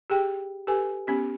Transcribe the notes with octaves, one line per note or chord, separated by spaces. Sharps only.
G4 G#4 G5
G4 A4 B4 G#5
B3 C#4 G4